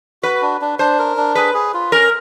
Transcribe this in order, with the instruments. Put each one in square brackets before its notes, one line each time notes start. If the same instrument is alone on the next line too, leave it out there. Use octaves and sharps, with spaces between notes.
[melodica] F#4 [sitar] B4
[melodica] D4
D4
[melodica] D4 [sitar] C5
[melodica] A#4
D4
[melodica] G#4 [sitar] B4
[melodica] G#4
F4
[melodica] C#4 [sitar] A#4